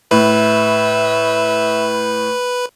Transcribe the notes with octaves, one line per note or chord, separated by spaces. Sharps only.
A2 B4 E5